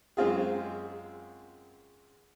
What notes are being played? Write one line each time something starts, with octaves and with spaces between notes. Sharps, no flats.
F#2 G#3 C4 F4 G#4